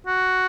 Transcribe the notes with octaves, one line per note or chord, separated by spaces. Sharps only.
F#4